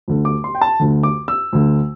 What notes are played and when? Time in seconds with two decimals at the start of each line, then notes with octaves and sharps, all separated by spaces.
0.08 D2 D3
0.25 D6
0.44 C6
0.55 G5
0.62 A5
0.80 D2 D3
1.03 D6
1.28 E6
1.53 D2 D3